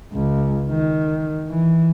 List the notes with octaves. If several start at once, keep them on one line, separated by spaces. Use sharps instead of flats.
C#2
D#3
E3